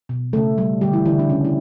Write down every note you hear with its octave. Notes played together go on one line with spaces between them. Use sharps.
B2
C#3 A3 A4
G3
D3 G3 G4
E3 E4
D3 E3 E4
D4
C#3 C#4
E4